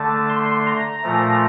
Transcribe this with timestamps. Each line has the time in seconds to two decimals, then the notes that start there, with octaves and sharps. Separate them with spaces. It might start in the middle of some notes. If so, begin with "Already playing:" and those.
Already playing: D3 A3 A5
0.29 C6
0.66 A#5
1.03 A#2 F3 A3